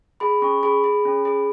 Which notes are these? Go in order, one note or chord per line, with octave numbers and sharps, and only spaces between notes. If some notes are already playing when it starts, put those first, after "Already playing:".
G#4 B5
C#4 C#6
G#4 B5
G#4
C#4
G#4